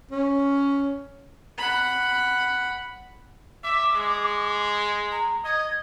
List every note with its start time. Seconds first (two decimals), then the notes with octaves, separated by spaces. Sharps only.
0.11 C#4
1.58 F#5 B5
3.64 E5 D6
3.95 G#3
5.12 A#5
5.44 D#5 G#6